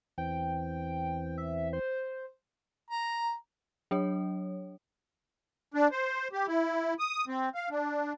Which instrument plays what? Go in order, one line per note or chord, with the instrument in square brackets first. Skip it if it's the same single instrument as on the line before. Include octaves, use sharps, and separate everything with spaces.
[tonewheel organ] E2 E3 C4 [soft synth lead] G5
[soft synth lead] E5
C5
[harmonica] A#5
[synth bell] F#3 D4 C#5
[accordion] D4
C5
G4
E4
D#6
C4
F5
D4